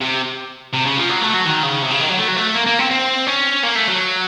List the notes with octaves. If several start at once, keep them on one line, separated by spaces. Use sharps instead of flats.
C3
C3
C#3
F3
F#3
A3
F#3
D#3
C#3
C3
C#3
D#3
F#3
A3
F#3
A3
A#3
A#3
C4
C4
C#4
A#3
A3
F#3